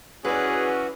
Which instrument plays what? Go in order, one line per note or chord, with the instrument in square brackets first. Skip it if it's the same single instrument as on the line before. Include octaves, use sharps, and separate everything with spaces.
[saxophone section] E3 F#3 C#4 [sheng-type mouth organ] F#4 [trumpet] G#4 [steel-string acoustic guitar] B4 D5